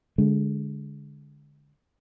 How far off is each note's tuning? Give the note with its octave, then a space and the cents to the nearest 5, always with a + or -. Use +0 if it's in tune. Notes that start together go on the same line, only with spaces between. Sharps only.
D3 -15 G#3 +0